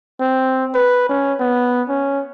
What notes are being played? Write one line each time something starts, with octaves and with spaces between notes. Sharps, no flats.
C4
B4
C#4
B3
C#4